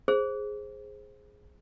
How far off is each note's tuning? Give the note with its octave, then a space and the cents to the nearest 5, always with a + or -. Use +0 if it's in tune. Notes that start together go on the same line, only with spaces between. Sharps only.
G#4 +0 C5 +15